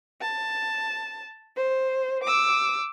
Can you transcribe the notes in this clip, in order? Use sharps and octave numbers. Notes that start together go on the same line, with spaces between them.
A5
C5
D6 E6